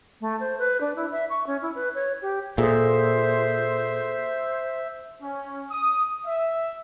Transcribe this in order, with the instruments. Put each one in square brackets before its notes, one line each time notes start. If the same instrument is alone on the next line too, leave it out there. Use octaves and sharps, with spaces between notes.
[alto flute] A3
C5
B4
D4
E4
E5
C#6
C#4
E4
B4
C#5
G4
[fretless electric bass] A#2 [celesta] G#4 A4 D#6 [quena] C5 [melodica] E5
[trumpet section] C#4
D#6
E5